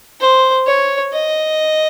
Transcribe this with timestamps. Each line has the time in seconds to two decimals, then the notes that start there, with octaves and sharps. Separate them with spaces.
0.20 C5
0.67 C#5
1.13 D#5